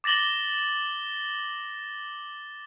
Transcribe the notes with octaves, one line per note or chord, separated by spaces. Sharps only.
D6 A6 A#6 F#7 G7